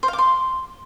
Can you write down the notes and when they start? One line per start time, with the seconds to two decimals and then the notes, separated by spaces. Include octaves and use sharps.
0.03 C5
0.08 F5
0.13 D6
0.18 C6